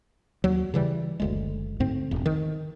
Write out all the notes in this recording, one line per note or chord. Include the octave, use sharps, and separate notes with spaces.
D#2 F#3
C#3 E3 G3
F#1 D2 G#3
D2 G#2 C4
E1
D#3